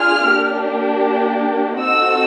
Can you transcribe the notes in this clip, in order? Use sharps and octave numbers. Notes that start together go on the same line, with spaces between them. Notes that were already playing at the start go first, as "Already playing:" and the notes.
Already playing: D4 F4 G#4 F6
A#3 D4 G4
C4 D#4 F#4 A4 E6